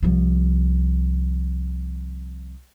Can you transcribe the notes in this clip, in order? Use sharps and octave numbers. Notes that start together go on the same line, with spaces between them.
C2 F3